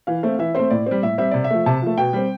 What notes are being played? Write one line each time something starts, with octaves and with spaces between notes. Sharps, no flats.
E3 F5
A3 C4
E3 E5
A3 C4 C5
A2 D5
G3 C4
A2 E5
G3 C4 E5
C3 D5
E5
F3 A3
C3 A5
F3 A3
B2 G5
G3 C4